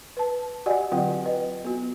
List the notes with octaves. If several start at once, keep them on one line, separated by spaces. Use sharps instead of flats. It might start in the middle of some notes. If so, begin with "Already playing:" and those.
B4 A5
F#4 G4 D5 D#5 F#5 G#5
D3 F#3 C4 F4 F#5 G5
B4 D#5
B3 F4 F#4